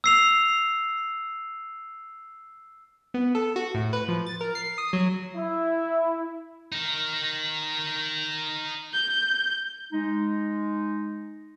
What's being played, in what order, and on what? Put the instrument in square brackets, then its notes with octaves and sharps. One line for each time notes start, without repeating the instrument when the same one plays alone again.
[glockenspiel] E6 C7 F7
[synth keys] B3
A4
F#4
A2
B4
F3
A6
A#4
C7
D#6
F#3
[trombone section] E4
[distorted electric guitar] D#4 A#4
[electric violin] G6
[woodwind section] G#3 D#4